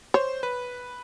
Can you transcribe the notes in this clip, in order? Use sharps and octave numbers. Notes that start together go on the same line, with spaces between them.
C5 C#5
B4